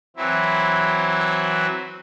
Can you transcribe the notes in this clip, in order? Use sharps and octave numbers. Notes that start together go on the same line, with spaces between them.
E3 F#3 C4 E4